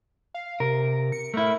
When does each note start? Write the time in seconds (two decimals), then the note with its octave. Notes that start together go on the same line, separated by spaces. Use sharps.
0.34 F5
0.60 C3 A#4
1.12 C#7
1.34 A3 E4 A#4